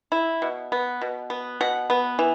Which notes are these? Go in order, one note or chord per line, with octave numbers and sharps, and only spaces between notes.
E4
B2
B3
B2
B3
B2 F#5
B3
E3